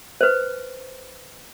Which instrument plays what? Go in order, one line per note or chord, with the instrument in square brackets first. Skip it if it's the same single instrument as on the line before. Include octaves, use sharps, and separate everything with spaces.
[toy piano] B4 C5